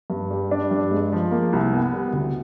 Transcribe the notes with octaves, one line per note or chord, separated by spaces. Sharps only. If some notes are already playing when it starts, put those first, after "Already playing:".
G2
G3
D4
G2
G#3
F3
A#3
C2
B3
G3
D2